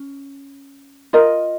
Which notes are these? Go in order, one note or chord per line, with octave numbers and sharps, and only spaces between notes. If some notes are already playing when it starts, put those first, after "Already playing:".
Already playing: C#4
F4 A#4 D#5